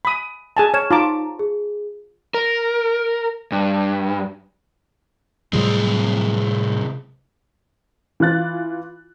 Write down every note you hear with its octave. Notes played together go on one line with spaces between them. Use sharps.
B5 D#6
G#4 G#5 A5
C#5 F6 G#6 E7
D#4 F4 A5 A#5 D6
G#4
A#4
G2
A2 C3 F3 G3 G#3 C4
E3 F4 F#6 A6